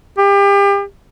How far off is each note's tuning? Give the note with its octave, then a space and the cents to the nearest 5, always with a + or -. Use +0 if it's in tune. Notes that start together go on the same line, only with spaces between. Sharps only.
G4 +35